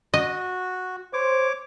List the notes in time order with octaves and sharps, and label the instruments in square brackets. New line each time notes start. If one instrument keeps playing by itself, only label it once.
[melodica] F#4 [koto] D#5
[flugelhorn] C5 [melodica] C#5 D6